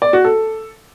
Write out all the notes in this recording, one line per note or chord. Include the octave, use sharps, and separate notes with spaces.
D5
F#4
A4